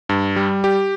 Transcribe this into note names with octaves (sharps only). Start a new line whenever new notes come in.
G2
G3
G4